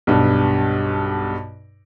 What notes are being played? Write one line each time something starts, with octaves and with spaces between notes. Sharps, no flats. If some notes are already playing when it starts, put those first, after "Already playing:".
B1 G2